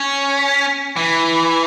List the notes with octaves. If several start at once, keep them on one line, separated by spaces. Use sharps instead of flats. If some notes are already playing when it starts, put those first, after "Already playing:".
Already playing: C#4
E3